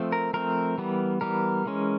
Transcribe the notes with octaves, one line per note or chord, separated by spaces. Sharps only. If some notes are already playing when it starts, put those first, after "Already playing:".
Already playing: F3 A3 C4
A#4
F3 A3 C4 A#4
E3 G3 B3
E3 G3 B3 A#4
E3 G#3 C#4